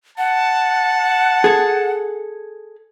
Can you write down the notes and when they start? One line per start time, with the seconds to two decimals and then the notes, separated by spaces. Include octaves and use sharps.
0.18 F#5 A5
1.44 G#4 A4